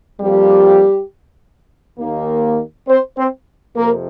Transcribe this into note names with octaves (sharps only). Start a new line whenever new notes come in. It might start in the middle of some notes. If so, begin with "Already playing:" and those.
F2 F3 G3 A#3 G4
D#2 D#3 A#3
C4 C5
C4 C5
F2 C3 A#3 A#4